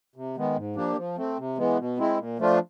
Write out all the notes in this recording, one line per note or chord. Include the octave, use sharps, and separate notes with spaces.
C3
D#3 G#3 B3
G#2
F3 A#3 D4 G4
F3
A3 C4
C3
E3 G#3 B3
B2
G#3 C4 E4
A#2
F3 A3 D4 F4